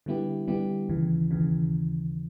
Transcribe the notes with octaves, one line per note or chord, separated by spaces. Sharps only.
D3 G3 B3 E4 G4
D3 G3 B3 E4 G4
D#2 C#3 E3
D#2 C#3 E3